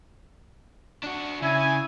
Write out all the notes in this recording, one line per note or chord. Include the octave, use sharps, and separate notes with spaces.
D4 F#4
C#3 E4 G#5